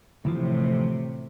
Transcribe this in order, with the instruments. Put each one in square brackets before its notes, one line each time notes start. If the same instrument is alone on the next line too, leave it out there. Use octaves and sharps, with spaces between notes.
[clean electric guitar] D2 E3 F3 [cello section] A2 C3